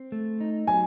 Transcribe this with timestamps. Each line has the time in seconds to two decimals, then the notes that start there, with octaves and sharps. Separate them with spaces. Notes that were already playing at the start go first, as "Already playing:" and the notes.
Already playing: C4
0.12 A3
0.40 D#4
0.67 F#3 G#5